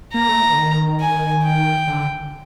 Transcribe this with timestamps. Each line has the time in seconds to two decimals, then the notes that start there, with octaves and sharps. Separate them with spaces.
0.14 A#3 A#5
0.29 A3
0.43 E3
0.53 D3
0.58 D#3
1.01 G#5
1.44 G5
1.87 D3